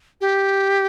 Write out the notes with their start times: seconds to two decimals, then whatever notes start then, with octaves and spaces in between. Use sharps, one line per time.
0.21 G4